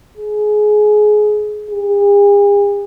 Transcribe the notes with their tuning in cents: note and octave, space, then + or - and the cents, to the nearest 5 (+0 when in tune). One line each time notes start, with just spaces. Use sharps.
G#4 +20
G#4 -45